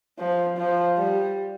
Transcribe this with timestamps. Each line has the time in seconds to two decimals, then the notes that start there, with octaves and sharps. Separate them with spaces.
0.19 F3
0.58 F3
0.97 G3